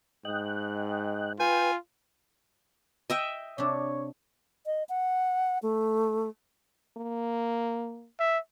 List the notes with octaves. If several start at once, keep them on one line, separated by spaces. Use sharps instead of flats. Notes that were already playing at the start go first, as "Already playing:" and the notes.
G#2 D#5 G5 F#6
F4 B4 G5 G#5
D#5 E5 G5
C3 D4 C#5
D#5
F#5
A3
A#3
E5